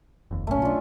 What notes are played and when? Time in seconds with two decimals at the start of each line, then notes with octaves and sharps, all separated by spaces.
0.31 F1 D#2
0.47 F#1 B1 A#2 A3 C#4
0.62 B1 D4 F4